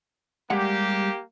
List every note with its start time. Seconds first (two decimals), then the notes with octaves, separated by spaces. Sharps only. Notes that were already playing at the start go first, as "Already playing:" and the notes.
0.50 G3 G#3 A#3 G4 F#5